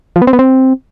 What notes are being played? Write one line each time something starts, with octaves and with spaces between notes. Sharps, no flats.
F3
B3
C4
B3
C4